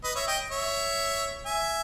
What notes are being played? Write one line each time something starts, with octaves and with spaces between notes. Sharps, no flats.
B4 D#5
C#5 E5
D#5 G5
C#5 E5
E5 G#5